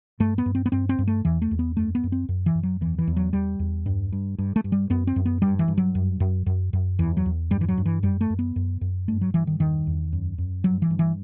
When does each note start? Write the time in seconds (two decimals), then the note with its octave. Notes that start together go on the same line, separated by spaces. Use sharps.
0.20 G2 A3
0.38 B3
0.46 G2
0.55 C4
0.66 B3
0.72 G2 C4
0.89 C4
0.99 G2
1.07 A3
1.25 E2 E3
1.42 A3
1.51 E2
1.59 B3
1.76 F#2 A3
1.95 B3
2.03 F#2
2.12 C4
2.29 F#2
2.46 E3
2.55 F#2
2.63 F#3
2.81 E2 E3
2.98 E3
3.07 E2
3.17 F#3
3.33 E2 G3
3.59 E2
3.86 G2
4.12 G2
4.38 G2
4.56 A3
4.64 G2
4.72 G3
4.90 F#2 B3
5.07 C4
5.16 F#2
5.25 B3
5.42 G2 G3
5.59 E3
5.68 G2
5.78 F#3
5.95 F#2
6.20 F#2
6.46 F#2
6.73 F#2
6.99 E2 E3
7.17 F#3
7.26 E2
7.51 G2 G3
7.61 E3
7.68 F#3
7.77 G2
7.86 E3
8.03 F#2 G3
8.21 A3
8.30 F#2
8.39 B3
8.56 F#2
8.81 F#2
9.08 G2 A3
9.21 F#3
9.34 G2 E3
9.47 D#3
9.59 E2 D#3
9.87 E2
10.13 F#2
10.38 F#2
10.64 G2 F#3
10.82 E3
10.90 G2
10.99 E3